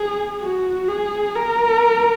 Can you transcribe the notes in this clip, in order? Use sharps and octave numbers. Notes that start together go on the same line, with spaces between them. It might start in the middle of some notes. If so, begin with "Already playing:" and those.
Already playing: G#4
F#4
G#4
A#4